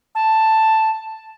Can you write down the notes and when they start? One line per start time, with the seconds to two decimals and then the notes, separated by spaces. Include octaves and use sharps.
0.15 A5